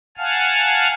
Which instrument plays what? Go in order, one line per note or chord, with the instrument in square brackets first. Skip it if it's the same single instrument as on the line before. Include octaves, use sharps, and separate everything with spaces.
[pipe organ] F5 F#5 G#5 A5 F6